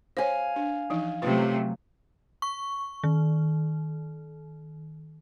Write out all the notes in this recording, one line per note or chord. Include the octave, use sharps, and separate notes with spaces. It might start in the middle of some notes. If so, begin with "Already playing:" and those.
C5 C#5 F5 G#5
D4
E3 F3 D#4
C3 F#3 A3 C#4 F4 B4
C#6
D#3